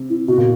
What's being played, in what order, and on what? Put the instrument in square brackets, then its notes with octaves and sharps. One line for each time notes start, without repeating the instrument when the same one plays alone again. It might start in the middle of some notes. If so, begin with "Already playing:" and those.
Already playing: [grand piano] C3
[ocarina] E4
[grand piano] B2 [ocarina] F#4
[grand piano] A#2